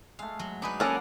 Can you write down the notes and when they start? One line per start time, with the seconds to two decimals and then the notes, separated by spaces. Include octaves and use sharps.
0.19 G#3 A3 F5
0.39 F#3
0.62 D4 D#4 G#4 B4 B5 C#6
0.80 A#3 C#4 A4 A#4 D5 F#5 G#5 A#5